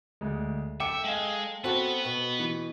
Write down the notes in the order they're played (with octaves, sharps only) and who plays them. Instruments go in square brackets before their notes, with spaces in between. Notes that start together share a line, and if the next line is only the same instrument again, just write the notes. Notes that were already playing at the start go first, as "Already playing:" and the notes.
[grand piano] D2 G#3
[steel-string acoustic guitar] A4 [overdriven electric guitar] E5 [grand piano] G5 D6 C#7
[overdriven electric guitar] G#3 [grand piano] F5 G5
[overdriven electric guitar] B3 B4 [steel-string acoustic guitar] C4 F#4 [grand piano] A4
[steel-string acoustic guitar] B2
[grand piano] E3